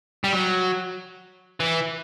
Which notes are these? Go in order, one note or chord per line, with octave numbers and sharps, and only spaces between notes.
G3
F#3
E3